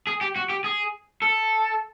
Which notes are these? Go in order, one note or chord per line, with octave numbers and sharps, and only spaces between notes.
G#4
G4
F#4
G4
G#4
A4